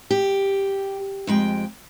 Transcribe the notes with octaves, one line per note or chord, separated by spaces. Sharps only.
G4
F2 G#3 G5